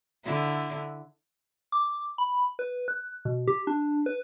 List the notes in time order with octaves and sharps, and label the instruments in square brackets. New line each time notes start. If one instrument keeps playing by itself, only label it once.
[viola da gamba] D3 E4
[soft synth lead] D6
B5
B4
F#6
B2
G4
D4
B4